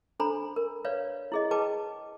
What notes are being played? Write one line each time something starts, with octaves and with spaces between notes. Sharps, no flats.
D4 A4 C5 G#5 A#5 B5
A#4
B4 C#5 D5 F5
E4 G#4 D#5
G#4 B4 G5 A5 D6